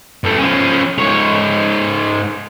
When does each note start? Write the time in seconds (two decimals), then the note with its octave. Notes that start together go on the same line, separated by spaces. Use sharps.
0.24 G2 A3
0.38 F3 C#4
0.99 G#2 C#5